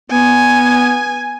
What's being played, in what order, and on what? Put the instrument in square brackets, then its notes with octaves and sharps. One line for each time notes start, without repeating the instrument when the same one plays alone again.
[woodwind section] B3 [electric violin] G#5